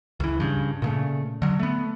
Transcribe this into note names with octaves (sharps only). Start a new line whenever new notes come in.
C#2 E3
G2 C#3
A#2 C#3 A3
D3 F#3
A3 B3